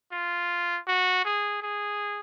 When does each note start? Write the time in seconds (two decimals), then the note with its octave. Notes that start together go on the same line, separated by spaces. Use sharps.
0.12 F4
0.87 F#4
1.25 G#4
1.62 G#4